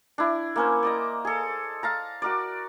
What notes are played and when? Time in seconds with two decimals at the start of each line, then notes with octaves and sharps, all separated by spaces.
0.18 D4 E4
0.56 A#3 C#4 C5
0.83 D5 D#5 A#5
1.25 G#4 A4
1.83 F5 A5 A#5
2.22 F#4 A#4 D5